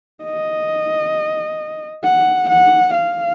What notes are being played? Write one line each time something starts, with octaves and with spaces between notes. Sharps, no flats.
D#5
F#5
F#5
F5